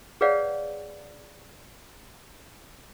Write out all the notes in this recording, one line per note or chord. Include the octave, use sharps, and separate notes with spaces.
G#4 B4 C#5 D5 F5 F#5